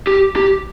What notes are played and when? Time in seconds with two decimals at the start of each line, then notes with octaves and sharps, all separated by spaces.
0.07 G4
0.36 G4